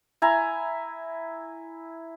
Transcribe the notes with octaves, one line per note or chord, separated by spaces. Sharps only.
E4 G#5 A#5